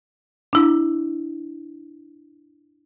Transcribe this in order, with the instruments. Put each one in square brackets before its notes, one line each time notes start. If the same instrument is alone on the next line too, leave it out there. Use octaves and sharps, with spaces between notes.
[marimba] D4 E4